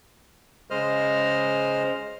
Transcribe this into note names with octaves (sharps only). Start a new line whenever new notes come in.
C#3 G#3 C5 D#5 F6